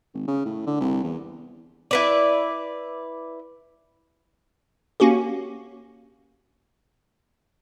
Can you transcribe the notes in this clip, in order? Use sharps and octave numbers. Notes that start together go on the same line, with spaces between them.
G#1
C#3
A2
D3
C2
E2
E4 B4 D5
A#3 C#4 F#4 G4